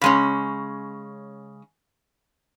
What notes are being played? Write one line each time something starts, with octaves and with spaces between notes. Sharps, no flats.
C#3 G#3 C#4